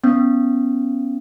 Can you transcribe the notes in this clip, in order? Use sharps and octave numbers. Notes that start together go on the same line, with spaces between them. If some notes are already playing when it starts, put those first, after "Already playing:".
B3 C#4